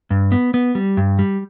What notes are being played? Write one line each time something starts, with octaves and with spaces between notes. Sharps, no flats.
G2
B3
B3
G3
G2
G3